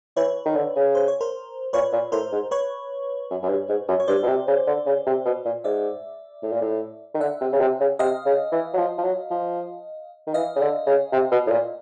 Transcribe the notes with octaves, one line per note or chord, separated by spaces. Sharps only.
E3 B4 C#5
D#3
D3
C#3
C5
C#5
A#4 C5
A#2 B4 C#5
A#2
A2 A#4 C5
G#2
B4 C#5
F#2
F#2
G2
G#2
F#2
C#5
G2 C5 D5
B2
C3
C#3
D3
C#3
C3
B2
A#2
G#2 D5 E5
A2
A#2
A2
D#3
D3 E5 F#5
C3
C#3
C3
C#3
C3 D#5 F5
C#3
E3
F#3
F3
F3
F#3
F3
D#3
E3 D#5 F5
C#3
D3
C#3
C3
B2
A2
A#2